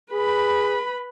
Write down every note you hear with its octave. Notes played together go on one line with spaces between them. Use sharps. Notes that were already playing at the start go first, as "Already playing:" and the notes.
G#4 B4 B5